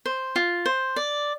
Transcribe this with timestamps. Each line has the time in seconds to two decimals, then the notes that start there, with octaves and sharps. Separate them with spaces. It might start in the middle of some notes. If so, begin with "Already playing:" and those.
0.06 C5
0.36 F4
0.66 C5
0.96 D5